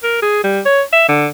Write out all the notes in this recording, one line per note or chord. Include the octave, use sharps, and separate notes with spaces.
A#4
G#4
G3
C#5
E5
D3